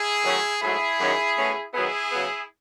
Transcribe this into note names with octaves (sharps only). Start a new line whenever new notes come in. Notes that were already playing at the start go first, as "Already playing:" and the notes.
Already playing: E4 G#4
D#3 F#3 A3 C#4
G#2 F#3 A3 E4 G#4
F#2 D#3 F#3 C#4
B2 A3 C#4
D#3 F#3 B3 E4 G#4
C#3 F#3 B3